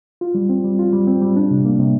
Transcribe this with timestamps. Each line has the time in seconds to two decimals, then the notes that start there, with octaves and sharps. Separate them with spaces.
0.21 F4
0.35 G3
0.49 C4
0.64 G3
0.79 F4
0.93 G3
1.07 C4
1.22 G3
1.36 D4
1.51 C3
1.65 A#3
1.79 C3